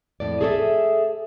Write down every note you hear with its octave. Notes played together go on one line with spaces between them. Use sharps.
F2 A2 D5
G#4 A4 C#5 E5